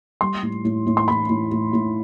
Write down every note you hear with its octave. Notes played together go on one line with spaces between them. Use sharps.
G3 C6
A2
A2
A2
C6
A2 B5
A2
A2
A2